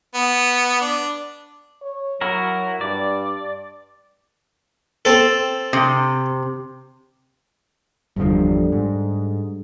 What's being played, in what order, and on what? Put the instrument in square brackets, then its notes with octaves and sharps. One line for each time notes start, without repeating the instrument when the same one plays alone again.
[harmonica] B3
D4
[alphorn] C#5
[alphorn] F#3 [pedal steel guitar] E4 F#4 A#4
[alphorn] G2 [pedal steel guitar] D5
[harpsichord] C4 A4
[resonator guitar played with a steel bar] C3
[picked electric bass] G1 E2 F3 [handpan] D3 G3
[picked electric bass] G#2